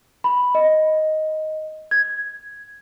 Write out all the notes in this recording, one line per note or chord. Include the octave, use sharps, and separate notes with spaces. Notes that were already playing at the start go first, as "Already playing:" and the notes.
B5
D#5
G#6